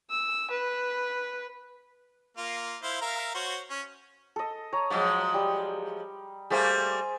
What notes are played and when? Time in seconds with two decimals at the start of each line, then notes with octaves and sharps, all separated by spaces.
0.10 E6
0.50 B4
2.37 A#3 F4
2.83 E4 C5 F5
3.02 A#4 E5 F5
3.34 F#4 C5 C#5
3.70 C#4
4.36 A4 D#5
4.73 C#5 A#5
4.90 F3 F#3 G#3 F#5 C6
5.34 G3
6.50 G3 A3 A#3 G#4 C5 G#5